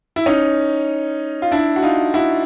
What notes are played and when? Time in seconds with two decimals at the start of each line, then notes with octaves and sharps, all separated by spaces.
0.16 E4
0.26 C#4 D#4
1.42 F4
1.52 D4 E4
1.76 F#4
1.83 D#4 F4
2.14 E4 F#4